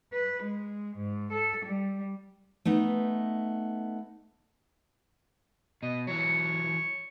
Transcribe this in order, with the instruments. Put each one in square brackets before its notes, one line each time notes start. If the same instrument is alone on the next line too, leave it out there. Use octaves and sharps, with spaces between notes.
[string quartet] B4
G#3
G#2
A4
G3
[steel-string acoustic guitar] A3 B3 D#4
[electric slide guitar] B2 [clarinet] D#5
[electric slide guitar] E3 F#3 [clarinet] C#5